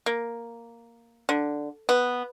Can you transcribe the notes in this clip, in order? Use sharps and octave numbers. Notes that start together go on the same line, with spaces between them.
A#3
D3
B3